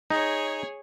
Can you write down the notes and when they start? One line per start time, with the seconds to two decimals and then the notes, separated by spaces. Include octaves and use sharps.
0.10 D#4 G#4 C#5